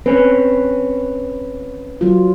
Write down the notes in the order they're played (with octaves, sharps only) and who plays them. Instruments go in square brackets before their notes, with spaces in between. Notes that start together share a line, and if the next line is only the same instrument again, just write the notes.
[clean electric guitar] C4 C#4 [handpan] B4
[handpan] F#3 F4